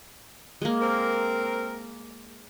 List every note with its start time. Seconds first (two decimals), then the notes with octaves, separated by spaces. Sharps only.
0.62 G#3 A#3
0.81 C4 A#4